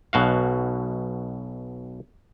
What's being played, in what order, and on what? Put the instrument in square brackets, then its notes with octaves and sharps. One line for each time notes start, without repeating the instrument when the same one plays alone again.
[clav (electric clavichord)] B1 B2 F#4 F5